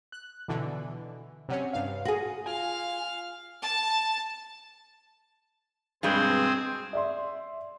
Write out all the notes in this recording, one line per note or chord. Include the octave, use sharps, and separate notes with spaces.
F#6
B2 D3 E3
C3 F#3 C#4
G2 F5
F#4 G#4
F4 F5 G#5 F6
A5
G2 B2 G#3 C4 G#4 C5
D5 E5 C6